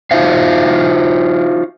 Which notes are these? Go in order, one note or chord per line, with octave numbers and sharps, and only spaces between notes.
D#4 F4 F#4 C5 E5 F5